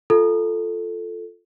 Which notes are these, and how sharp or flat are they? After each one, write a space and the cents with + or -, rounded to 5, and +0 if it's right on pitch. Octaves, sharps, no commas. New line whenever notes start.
F4 +0 A4 +0